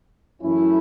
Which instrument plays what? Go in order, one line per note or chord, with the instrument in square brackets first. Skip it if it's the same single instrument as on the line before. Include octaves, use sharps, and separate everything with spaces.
[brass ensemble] F#2 E3 A3 C#4 E4